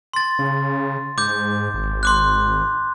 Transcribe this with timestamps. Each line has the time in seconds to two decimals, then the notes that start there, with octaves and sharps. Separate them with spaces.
0.14 C6 A6
0.39 C#3
1.18 G#2 D6 G6
1.74 G#1
2.03 C6 D6 F#6